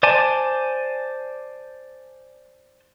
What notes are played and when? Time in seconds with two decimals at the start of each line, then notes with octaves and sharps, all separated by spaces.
0.03 C5 D5 G#5 A5